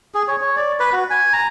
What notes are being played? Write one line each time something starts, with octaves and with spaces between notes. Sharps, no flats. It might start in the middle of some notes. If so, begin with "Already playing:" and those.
G#4
C#5
C#5
D5
B4
F#4
G#5
A#5